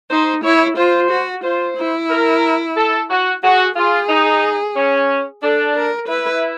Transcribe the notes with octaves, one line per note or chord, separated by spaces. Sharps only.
D#4 C5
E4 C#5
F4 C5
F#4
F4 C5
E4
A#4
A4
F#4
F#4 G#4
F4 G#4
D#4
C#4
D4 A4
A#4
E4 B4